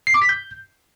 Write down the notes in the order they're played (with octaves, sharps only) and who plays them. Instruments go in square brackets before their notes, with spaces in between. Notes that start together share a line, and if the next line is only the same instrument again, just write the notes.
[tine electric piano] C7
D6
B6
G6